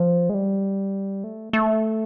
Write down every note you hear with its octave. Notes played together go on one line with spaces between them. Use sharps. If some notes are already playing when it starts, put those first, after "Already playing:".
Already playing: F3
G#3
G3
A3
A3